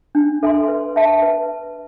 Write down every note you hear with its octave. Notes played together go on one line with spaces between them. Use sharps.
D4
A4 E5 G#5 C6
B4
E5 A5
B4